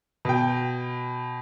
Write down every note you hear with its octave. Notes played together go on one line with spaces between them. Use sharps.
B2 G5